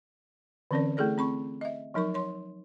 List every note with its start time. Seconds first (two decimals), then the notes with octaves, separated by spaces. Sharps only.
0.71 D3 E3 C4 C#4 A#4 D5
0.97 A3 E4 G#4 A4 D5
1.18 C4 B5 C#6
1.61 D#5 E5
1.94 F3 F#3 D#4 A#4 C#6
2.14 C#5 C6